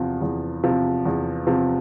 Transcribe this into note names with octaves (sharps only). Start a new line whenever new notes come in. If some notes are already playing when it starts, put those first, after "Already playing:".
Already playing: E2 C3 F3
E2
C3 F3
E2
C3 F3